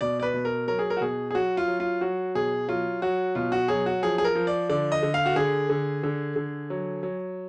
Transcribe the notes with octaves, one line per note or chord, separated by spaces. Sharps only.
B2 D5
D5
B4
B2
A#4
F#3 A#4
G#4
A#4
F#4
B2 G#4
G#4
F#3 F#4
F4
F#3
F4
F#3 F#4
B2 G#4
F#3 F4
F#3 F#4
B2 F4
F#4
F#3 G#4
F#4
F3 G#4
G#4
A#4
F3
D5
D3 D5
D#5
D3
F5
F#4
D3 G#4
D3
D3
D3
F#3
F#3